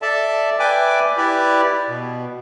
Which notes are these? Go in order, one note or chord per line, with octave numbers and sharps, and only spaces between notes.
A4 D5 E5 A5
B4 D5 E5 G5 G#5 D6
E4 G4 B4 D5 E5
B2